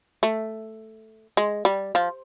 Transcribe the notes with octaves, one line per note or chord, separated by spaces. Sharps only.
A3
G#3
G3
F3